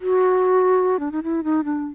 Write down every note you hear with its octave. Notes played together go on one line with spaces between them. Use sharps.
F#4
D4
D#4
E4
D#4
D4